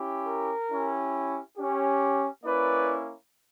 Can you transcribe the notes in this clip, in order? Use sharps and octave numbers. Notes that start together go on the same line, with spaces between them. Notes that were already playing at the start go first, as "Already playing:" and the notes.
Already playing: C#4 E4 G4
A#4
C#4 E4 G4
C#4 G4
A#3 C#4 E4 B4 D5